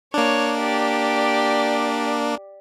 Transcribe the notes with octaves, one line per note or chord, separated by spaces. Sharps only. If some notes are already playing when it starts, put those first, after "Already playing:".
A#3 D4 C#5
G4 D5